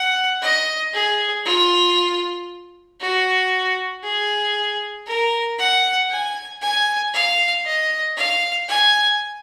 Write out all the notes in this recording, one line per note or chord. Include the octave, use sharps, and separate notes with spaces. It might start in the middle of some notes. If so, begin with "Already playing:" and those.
Already playing: F#5
D#5
G#4
F4
F#4
G#4
A#4
F#5
G#5
G#5
F5
D#5
F5
G#5